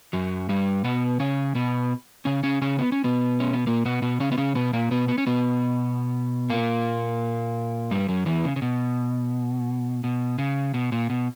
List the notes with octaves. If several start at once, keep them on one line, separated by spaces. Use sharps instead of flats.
F#2 F#3
G2 G3
B2 B3
C#3 C#4
B2 B3
C#3 C#4
C#3 C#4
C#3 C#4
B3
C#4
B2 B3
C#4
B3
A#2 A#3
B2 B3
B2 B3
C#3 C#4
B3
C#3 C#4
B2 B3
A#2 A#3
B2 B3
B3
C#4
B2 B3
A#2 A#3
G2 G3
F#2 F#3
E2 E3
C#3
C#3
B2
B2
C#3
B2
A#2
B2